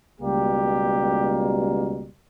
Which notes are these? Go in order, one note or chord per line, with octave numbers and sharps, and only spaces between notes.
C#2 B2 G3 A#3 G4